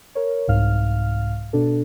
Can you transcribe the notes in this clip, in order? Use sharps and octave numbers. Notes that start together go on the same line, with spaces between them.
A#4 C#5
C2 G#2 F5 F6
B2 D4 A4